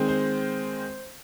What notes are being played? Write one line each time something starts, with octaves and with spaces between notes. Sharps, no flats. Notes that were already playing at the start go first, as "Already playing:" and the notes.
Already playing: D#3 G#3 C4
C5